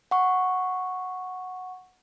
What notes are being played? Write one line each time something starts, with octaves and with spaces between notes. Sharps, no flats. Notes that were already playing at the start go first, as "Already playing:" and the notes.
F#5 C#6